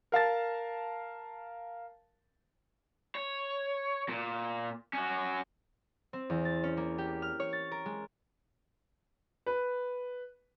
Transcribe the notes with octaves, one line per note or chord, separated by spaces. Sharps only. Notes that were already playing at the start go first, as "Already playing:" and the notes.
A#4 F5 A5 A6
C#5
A#2
C#4 F#4
C4
E2
A6
C#4
A#3
G4
F6
C#5
A6
A#4
G#3
B4